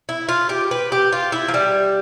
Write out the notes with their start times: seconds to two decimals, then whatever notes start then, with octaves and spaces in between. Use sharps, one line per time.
0.09 E4
0.29 F4
0.49 G4
0.71 B4
0.92 G4
1.12 F4
1.32 E4
1.48 F3
1.54 G3